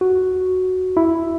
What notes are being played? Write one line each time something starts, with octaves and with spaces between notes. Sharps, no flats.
F#4
E4